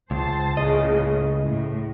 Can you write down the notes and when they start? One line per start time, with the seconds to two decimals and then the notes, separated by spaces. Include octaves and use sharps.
0.11 C#2 C5 A5
0.57 C#2 A2 C#3 D#5
1.40 A2